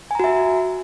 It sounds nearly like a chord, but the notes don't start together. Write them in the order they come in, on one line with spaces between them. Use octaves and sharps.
G#5 A#5 F#4 E5